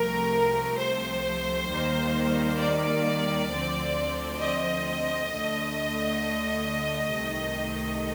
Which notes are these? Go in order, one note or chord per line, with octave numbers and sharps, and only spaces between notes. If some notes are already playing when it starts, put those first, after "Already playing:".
Already playing: C2 C3 F3 A3 A#4
C5
D#2 D#3 G3 A#3
D5
D2 D3 F3 C4
D#5
D2 D3 A3
C2 C3 D#3 A3